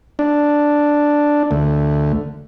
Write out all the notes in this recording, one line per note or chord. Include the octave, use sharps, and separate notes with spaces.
D4
D2